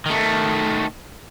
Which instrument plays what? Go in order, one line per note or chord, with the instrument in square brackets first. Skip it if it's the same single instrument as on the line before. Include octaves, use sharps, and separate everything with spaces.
[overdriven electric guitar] D#3 A3